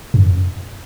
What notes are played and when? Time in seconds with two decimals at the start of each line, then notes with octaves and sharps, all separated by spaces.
0.14 F#2